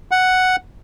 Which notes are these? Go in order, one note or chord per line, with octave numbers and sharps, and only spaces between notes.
F#5